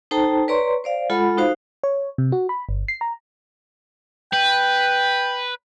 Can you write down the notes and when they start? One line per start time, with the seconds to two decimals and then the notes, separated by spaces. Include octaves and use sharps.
0.11 D#4 A4 C5 G5 A5 A#5
0.48 B4 C#5 D5 A#5 C6 C#6
0.84 C5 D5 F5
1.10 G#3 F4 A4 F#5 B5
1.38 D#4 F#4 C5 F5
1.84 C#5
2.18 C3
2.32 F#4
2.49 B5
2.69 G1
2.88 C7
3.01 A#5
4.33 B4 G5